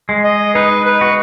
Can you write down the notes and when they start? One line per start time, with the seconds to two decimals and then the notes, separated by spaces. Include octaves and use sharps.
0.09 G#3
0.24 D#5
0.55 D#4 B4
0.86 B4
1.01 F#4